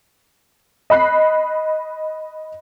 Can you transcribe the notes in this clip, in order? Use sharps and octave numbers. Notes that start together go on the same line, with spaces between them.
D#5 B5 F#6 C7